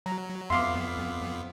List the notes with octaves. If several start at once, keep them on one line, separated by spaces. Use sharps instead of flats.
F#3 A#5
F2 B3 E5 F5 C6 D6